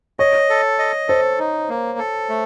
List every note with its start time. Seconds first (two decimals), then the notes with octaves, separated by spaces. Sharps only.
0.19 C#5 D#5
0.50 A4
0.79 D#5
1.08 A4 C5
1.39 D#4
1.69 A#3
1.99 A4
2.29 A3